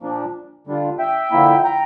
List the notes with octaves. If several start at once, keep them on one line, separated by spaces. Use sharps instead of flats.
A#2 F3 A#3 D4
D3 G3 D4 F4
E5 G5
D3 F3 A#3 E4
G5 A#5